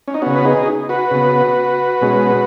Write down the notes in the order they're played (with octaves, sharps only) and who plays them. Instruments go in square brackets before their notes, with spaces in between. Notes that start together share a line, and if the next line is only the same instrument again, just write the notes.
[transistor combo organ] C#4
D#4
C#3 B3 C#4 F#4
B4
D#4 G#4
F#4 B4
C#3 B3
B2 G#3 C#4